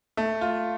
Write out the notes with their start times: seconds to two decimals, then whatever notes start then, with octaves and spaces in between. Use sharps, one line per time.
0.17 A3
0.41 F4